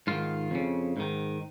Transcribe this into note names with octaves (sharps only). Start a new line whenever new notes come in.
G#2 D#3 F4
F2 C#3
G#2 D#3